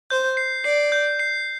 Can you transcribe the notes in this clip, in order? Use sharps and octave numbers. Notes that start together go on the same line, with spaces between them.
C5 G6
C7
D5 C7
G6
C7